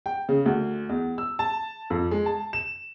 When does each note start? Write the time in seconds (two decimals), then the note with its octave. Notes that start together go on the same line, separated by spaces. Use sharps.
0.06 G5
0.29 C#3
0.46 D2
0.89 E2
1.18 E6
1.39 A5
1.90 F2
2.11 G#3
2.26 A5
2.53 E7